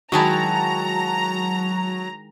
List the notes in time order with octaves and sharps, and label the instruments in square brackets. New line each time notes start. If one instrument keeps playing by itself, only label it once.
[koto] D#3 G#3 E4 [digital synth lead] F#3 [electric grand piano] F#4 A5 [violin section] A#5